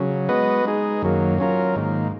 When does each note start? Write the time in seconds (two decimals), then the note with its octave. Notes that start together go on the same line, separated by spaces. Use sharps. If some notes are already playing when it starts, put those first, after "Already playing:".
Already playing: C#3 F#3
0.29 G#3 B3 F#4 B4 D#5
0.65 G#3 D#4 G#4
1.02 F#2 D#3 F#3 A#3
1.38 F#3 C#4 F4 A#4
1.76 G#2 D#3 A#3